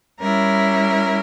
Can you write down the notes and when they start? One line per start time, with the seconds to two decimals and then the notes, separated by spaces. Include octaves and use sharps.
0.20 G3 C#4 E4 A#4